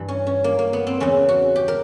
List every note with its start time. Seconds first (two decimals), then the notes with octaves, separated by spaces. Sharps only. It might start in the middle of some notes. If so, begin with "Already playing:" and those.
Already playing: G2 E3
0.08 C#4
0.27 C#4
0.44 A#3
0.59 A#3
0.73 B3
0.87 C4
1.00 E2 C#3 E3 C#4
1.29 F#4
1.56 G4
1.68 A#4